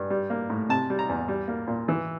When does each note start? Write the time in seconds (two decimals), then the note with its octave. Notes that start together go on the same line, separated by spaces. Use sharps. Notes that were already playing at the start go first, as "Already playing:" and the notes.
Already playing: G2
0.10 G3
0.30 A#3
0.50 A2
0.69 C3 A5
0.90 G3
0.99 A#5
1.09 E2
1.28 G3
1.48 A#3
1.68 A#2
1.88 E3